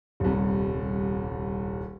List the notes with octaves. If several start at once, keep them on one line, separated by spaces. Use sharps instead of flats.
D#1 C2